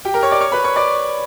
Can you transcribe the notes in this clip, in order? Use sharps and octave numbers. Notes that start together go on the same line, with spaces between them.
G4 G5
A#4 A#5
C#5 C#6
D5 D6
C#5 C#6
B4 B5
C#5 C#6
D5 D6